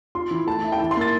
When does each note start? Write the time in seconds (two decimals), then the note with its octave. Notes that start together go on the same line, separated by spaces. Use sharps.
0.15 F4 C6
0.31 E3
0.47 A3 A5
0.64 E4
0.72 G5
0.80 E3 A5
0.91 C6
0.97 A#3 A6